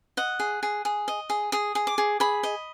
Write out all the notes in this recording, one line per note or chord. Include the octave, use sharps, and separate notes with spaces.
D#5 F#5
G#4
G#4
G#4
D#5
G#4
G#4 D#6
G#4
D6
G#4
G#4 B5
D#5